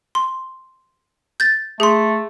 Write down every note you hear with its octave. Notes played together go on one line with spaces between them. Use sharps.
C6
G6 A6
A3 G#4 C6